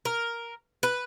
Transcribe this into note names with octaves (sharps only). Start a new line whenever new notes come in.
A#4
B4